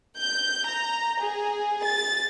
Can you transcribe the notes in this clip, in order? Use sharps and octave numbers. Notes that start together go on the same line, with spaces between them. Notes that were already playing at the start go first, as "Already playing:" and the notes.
G6
A#5
G#4
A6